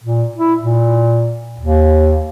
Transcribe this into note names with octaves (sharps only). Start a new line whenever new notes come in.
A#2
E4
A#2
D#2